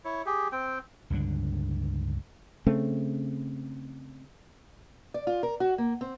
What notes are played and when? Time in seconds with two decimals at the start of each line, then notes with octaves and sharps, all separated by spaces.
0.05 E4 C#5
0.26 G4 G#4
0.52 C4 G5
1.10 C#2 G2 D3 D4
2.67 C#3 A3 C4
5.14 D5
5.27 F4
5.43 A#4
5.60 F#4
5.78 A#3
6.01 C4